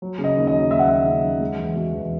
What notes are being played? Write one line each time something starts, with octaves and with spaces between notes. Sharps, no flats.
F#3
C#3
D#5
D#2
D#5
F#3
D#2 E5
F#5
D#2 E5
C#3
F#3
G#3
E2
B2
E2